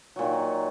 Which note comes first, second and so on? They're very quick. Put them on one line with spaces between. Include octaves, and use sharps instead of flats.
F#3 A#2 D#3